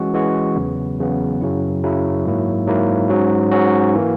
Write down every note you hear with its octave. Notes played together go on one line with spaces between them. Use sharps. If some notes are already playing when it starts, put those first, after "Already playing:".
Already playing: E3 G#3 C#4 F#4
E3 G#3 C#4 F#4
E2 C#3 F#3 B3
E2 C#3 F#3 B3
F#2 C#3 F#3 C#4 E4
F#2 C#3 F#3 C#4 E4
G#2 F#3 A#3 E4
G#2 F#3 A#3 E4
G#2 F#3 C#4 F#4
G#2 F#3 C#4 F#4
E3 A#3